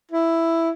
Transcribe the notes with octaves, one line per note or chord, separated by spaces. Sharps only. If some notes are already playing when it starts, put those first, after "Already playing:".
E4